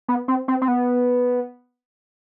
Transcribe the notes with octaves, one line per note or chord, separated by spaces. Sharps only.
B3
C4
C4
C4
B3